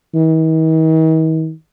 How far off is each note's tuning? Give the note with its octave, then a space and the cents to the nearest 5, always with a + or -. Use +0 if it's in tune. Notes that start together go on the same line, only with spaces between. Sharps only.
D#3 +45